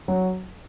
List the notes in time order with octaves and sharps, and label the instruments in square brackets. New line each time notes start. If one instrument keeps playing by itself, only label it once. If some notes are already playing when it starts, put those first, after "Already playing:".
[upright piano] F#3